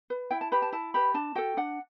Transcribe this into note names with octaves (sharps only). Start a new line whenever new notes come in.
B4
E4 G5
A5
G4 B4 B5
A5
E4 A5
G4 B4 B5
D4 A5
F#4 A4 G5
D4 F#5